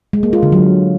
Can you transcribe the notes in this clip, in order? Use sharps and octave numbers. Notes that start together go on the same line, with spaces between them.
G#3
A#3
F4
D3
F#3